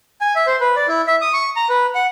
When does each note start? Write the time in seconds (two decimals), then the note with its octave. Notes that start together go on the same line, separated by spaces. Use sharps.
0.21 G#5
0.35 E5
0.47 C5
0.61 B4
0.76 D5
0.88 E4
1.07 E5
1.21 D#6
1.33 C#6
1.56 A#5
1.69 B4
1.95 F#5